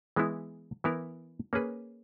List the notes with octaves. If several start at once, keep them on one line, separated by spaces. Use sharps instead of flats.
E3 G#3 B3 E4
E3 B3 E4 A#4
A#3 C#4 G#4 B4